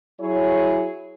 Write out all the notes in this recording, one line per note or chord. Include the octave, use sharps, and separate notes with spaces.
F#3 E4 G#4 C#5